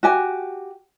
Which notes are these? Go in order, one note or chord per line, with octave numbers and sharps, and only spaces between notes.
F#4 G4 G#5